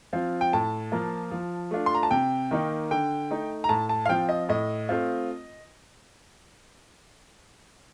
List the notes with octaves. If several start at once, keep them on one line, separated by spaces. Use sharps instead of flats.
F3 C4 F4
G5
A2 A5
F3 A#3 F4
F3
A3 D4 F4
C6
A#5
A5
C3 G5
D#3 A#3 D#4
D3 G5
A3 D#4
A#5
A2 A5
A5
F5
F3 C4 F4 G5
D#5
A2 D#5
A3 C4 F4